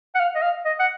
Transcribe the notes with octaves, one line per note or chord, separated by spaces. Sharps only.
F#5
F5
D#5
F5
D#5
F#5